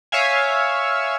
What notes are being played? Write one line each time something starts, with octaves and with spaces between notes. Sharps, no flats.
C#5 E5 F5 G#5